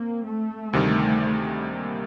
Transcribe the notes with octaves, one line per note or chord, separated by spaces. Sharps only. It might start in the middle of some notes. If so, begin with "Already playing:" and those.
Already playing: A#3 C4
A3
D2 C3 D#3 G3
A#3